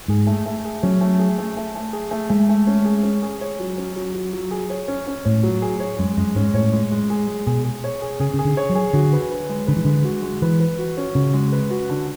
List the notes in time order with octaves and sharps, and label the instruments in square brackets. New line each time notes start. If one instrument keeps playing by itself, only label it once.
[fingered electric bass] G#2 [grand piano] G#4
[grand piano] A3
A3
G#4
[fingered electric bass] F#3 [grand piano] C#4
[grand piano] A3
G#4
A3
A3
A3
G#4
A3
[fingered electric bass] G#3 [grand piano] A3
[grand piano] A3
C#4
G#4
C#4
G#4
C#5
F#3
C#4
F#3
F#3
F#3
G#4
C#5
C#4
C#4
[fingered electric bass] A2 [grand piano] C#5
[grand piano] F#3
G#4
C#5
[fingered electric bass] F#2 [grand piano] G#3
[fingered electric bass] F#2 [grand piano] G#3
[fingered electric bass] G#2 [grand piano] C#4
[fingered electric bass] A2 [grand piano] C#5
[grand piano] G#3
G#3
G#4
G#3
[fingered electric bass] B2 [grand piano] G#4
[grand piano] G#4
C#5
G#4
[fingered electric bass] C#3 [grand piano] G#4
[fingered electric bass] C#3
[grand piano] G#4
[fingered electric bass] D3
[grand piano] C#5
[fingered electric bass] F#3
[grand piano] G#4
[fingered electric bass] D3 [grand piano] F#4
[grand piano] B4
B4
G#3
[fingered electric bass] D3 [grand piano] B4
[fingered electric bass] E3
[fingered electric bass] D3 [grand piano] G#3
[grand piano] F#4
G#3
[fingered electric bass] E3 [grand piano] B4
[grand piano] B4
F#4
C#4
[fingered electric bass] C#3 [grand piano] F#4
[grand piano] G#3
B4
F#4
D3